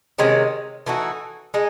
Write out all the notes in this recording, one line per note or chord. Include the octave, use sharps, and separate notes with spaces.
C3 D#3 G#3 C#4
E3 A3 D#4 F#4
G#3 D#4